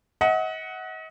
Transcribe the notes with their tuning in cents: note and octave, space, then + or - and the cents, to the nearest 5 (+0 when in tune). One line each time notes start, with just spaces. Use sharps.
D#5 +40 F#5 +0